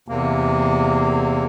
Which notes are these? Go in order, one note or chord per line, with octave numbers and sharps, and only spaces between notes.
E2 C3 A#3